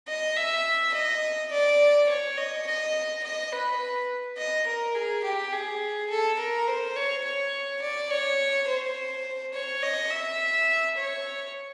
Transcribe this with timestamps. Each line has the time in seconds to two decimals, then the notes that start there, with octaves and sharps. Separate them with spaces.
0.08 D#5
0.37 E5
0.94 D#5
1.51 D5
2.09 C#5
2.37 D#5
2.67 D#5
3.23 D#5
3.52 B4
4.38 D#5
4.67 A#4
4.95 G#4
5.24 G4
5.53 G#4
6.10 A4
6.39 A#4
6.67 C5
6.96 C#5
7.24 C#5
7.82 D5
8.10 C#5
8.68 C5
9.53 C#5
9.83 D#5
10.10 E5
10.98 C#5